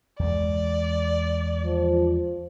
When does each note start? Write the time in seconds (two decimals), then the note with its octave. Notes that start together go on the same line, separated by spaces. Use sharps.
0.19 E2 G#3 D5
1.65 F3